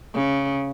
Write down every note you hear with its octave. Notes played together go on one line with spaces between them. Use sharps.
C#3